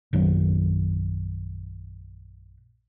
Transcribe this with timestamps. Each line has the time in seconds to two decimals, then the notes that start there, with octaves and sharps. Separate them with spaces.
0.13 A#1 F#2 D#3 F#3